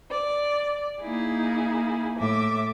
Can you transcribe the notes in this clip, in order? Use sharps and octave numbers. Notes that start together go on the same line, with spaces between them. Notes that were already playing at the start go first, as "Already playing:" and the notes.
D5
A#3 D#4 E4 G#4
A2 E5 D6